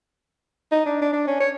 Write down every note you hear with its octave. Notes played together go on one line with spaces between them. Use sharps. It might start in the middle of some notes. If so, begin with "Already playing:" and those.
D#4
D4
D4
D4
C#4
C#5